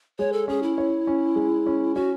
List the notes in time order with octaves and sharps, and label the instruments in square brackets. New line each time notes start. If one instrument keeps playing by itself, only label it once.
[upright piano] G#3 [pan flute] C#5
[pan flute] A4
[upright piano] C#4 [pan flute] G#4
[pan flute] E4
[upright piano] C#5
C#4
G#3
C#4
[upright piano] C#4 [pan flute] F#4